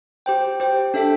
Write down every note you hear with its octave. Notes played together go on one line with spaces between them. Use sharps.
G4 C5 G5
G4 C5 G5
D4 A4 E5 G5